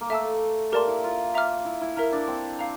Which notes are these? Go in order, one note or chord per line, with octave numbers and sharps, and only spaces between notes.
A#3
A3 E5 A5 E6
A#3 G4 A#4 D5 A5 C6
E4
F4
E5 A#5 D6 F6
E4
E4
E4 A#4 E5 A#5 F6
D4
C4
F5 A#5